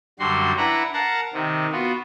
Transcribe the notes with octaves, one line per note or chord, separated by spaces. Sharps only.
F#2 D3 G3 F#4 C6
D4 E4 B4 F#5 A#5
A#4 F5 F#5 A5 A#5
C3 D#3
B3 F4 F#4